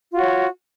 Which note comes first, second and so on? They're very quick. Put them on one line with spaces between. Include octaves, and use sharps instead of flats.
F4 F#4 C#5